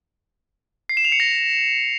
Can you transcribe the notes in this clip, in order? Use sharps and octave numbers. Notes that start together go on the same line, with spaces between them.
C7
E7
F7
C#7
A#6